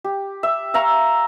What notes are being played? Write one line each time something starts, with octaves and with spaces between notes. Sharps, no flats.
G4
E5
E5 F5 A#5 C#6